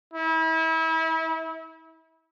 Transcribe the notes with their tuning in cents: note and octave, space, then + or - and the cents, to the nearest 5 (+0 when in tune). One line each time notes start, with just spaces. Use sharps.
E4 -35